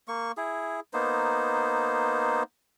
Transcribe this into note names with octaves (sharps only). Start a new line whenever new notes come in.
A#3 C#6
E4 G#4
A#3 B3 D#4 C5